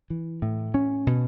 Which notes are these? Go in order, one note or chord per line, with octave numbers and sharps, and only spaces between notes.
E3
A2
C#4
B2